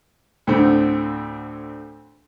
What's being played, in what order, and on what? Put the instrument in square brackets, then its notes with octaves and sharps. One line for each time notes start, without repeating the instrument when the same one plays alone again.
[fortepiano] D2 A2 D3 A3 C4